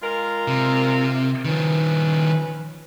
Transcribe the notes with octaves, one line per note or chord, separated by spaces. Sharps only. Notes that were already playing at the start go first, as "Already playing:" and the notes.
G#3 F4 A#4
C3
D#3 F3 C#4 B4